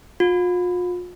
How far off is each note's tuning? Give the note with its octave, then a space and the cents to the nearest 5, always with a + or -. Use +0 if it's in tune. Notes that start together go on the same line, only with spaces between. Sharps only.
F4 +40